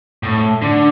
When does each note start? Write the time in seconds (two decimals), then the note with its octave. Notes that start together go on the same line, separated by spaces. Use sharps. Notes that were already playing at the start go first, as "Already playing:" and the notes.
0.23 A2
0.62 D3